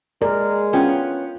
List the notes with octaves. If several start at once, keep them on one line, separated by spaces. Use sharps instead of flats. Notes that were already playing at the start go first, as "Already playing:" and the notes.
G#3 A#4 D5
B3 C#4 F4 G5